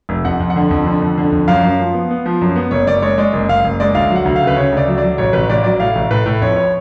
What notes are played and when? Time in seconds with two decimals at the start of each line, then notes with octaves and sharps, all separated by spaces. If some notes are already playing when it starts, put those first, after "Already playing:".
0.09 F1
0.25 F2 F#5
0.40 F2
0.50 F#5
0.56 D3
0.71 F2
0.86 D3
1.02 F2
1.18 D3
1.32 F2
1.48 F#2 F5
1.63 F#2
1.80 F3
1.94 B3
2.11 B3
2.26 F3
2.41 F#2
2.56 B3
2.71 F#1 C#5
2.87 F#1 D5
3.02 G#3 C#5
3.18 G#3 D5
3.33 F#1
3.48 F#1 F5
3.64 F#1
3.80 G#3 D5
3.95 D2 F5
4.11 F#3
4.16 F#5
4.26 D2
4.36 F5
4.41 C#3
4.47 B4
4.56 C#3 C#5
4.72 D2 D5
4.88 F#3
4.98 F#3 D5
5.18 A1 C#5
5.33 A1 B4
5.50 A1 D5
5.64 F#3 D5
5.80 A2 F5
5.96 A1
6.11 A2 B4
6.26 A2
6.42 F2 C#5
6.56 C#5